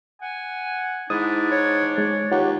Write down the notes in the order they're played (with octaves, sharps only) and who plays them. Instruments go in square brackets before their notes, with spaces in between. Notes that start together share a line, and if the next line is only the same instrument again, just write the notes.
[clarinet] F#5 [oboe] G#5
[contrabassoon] G#2 [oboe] D4 [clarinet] E4 [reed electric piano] D#6
[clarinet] C#5
[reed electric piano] G#3 [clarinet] C#5
[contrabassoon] D#2 [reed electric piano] F4 C#5 F#5 [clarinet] G4